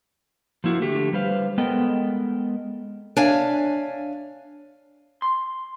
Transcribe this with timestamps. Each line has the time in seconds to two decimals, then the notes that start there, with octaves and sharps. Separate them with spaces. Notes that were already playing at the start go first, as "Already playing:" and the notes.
0.64 F3 A#3 E4 F#4
0.81 D3 A3 G4
1.13 G3 B4 C5 F5
1.58 G#3 B3 A4 A#4 D#5 G5
3.17 D4 C#5 E5 F5 G#5
5.22 C6